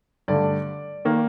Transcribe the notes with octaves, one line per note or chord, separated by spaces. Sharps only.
G2 D3 A3 D5
D#3 A#3